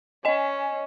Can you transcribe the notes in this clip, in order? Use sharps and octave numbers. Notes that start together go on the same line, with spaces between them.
C#4 D#5 G#5